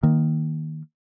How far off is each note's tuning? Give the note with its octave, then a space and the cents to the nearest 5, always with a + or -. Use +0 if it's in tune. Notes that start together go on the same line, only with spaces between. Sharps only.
D#3 +0 A#3 +0